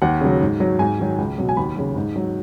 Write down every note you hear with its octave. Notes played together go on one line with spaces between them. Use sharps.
D#2 F#5
C#3 F#3
G#2
F#3
G#2 G#5
D#3 F#3
C#2
B2 F#3
G#5
D#2 B5
C#3 F#3
G#2
F#3